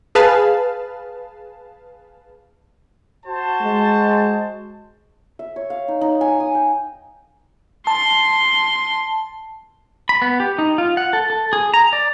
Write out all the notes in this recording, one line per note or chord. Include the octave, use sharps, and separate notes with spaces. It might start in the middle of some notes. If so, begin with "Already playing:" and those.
G#4 B4 F5 A5
F#4 C5 A5
G#3
E5
C#5
F5
D#4
D#4
G#5
D#6
G5
A5 C6
B5
B3
G4
D#4
F4
F#5
A4
A4
G#4
A#5
D5